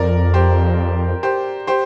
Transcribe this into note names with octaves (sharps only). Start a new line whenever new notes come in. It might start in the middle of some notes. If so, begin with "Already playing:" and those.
Already playing: F2 A#4 D5
G4 C5
G4 C5
G4 C5